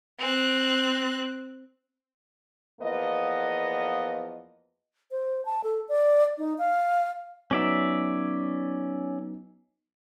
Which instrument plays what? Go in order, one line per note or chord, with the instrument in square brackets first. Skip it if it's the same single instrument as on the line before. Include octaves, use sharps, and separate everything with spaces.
[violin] C4 F#6
[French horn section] E2 F3 A#3 B3 D#5
[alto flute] C5
A5
A4
D5
D#4
F5
[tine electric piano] F#3 B3 D#4 [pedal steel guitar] C#4 D5 E5